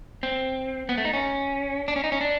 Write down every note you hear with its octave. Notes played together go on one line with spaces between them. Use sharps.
C4
B3
A3
D#4
C#4
D4
C#4
D#4
C#4
D4